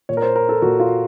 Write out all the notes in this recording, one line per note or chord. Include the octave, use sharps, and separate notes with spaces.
A#2 C#5
A#4
C5
A#4
A4
A#2 F#4
F4